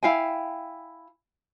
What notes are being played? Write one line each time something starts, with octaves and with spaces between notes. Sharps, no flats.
E4 F5 G5 G#5